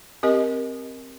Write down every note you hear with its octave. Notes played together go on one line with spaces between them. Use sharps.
C4 G4 A#4 D#5